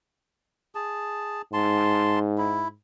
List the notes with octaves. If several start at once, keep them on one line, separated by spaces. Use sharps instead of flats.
G#4 A5
G#2 A5 C6
E4